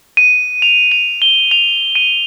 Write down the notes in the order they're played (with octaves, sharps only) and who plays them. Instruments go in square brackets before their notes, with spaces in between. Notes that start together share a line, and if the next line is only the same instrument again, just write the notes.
[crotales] D#7
F7
F7
G7
F7
D#7